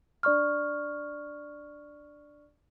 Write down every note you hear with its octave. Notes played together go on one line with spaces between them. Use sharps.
D4 D5 C#6 F6